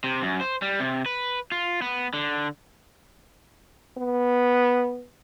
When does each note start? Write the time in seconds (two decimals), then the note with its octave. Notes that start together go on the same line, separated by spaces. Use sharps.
0.04 C3
0.22 F#2
0.41 C5
0.62 G3
0.80 C3
1.06 B4
1.52 F4
1.82 B3
2.14 D3
3.98 B3